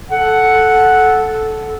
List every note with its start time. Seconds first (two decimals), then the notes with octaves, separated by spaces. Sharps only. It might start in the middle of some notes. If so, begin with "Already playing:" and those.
0.11 A4 F#5